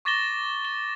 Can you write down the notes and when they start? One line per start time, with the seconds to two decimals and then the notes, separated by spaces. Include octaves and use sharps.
0.05 C#6 D6 A6 A#6 E7 G7
0.65 G7